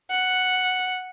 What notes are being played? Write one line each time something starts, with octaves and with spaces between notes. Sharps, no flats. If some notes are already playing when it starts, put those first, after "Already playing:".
F#5